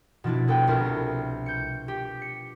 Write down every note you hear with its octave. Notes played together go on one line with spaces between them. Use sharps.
B2 F3 D4 E4
B3 A4 B4 G5
C2 F4 A#4
G6 C#7
G4
C#7